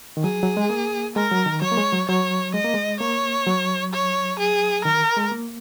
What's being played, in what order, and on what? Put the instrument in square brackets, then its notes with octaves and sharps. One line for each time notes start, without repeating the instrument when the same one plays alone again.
[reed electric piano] D#3
[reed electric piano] F#3 [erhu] G#4
[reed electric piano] F#3
G#3
A#3
[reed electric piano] G#3 [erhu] A#4
[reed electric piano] F#3
D#3
[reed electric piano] F#3 [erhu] C#5
[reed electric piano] A#3
G#3
F#3
[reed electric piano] F#3 [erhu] C#5
[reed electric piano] G#3 [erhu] D#5
[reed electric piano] A#3
G#3
[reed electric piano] A#3 [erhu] C#5
[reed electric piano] F#3
[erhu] C#5
G#4
[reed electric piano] D#3 [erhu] A#4
[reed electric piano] G#3
A#3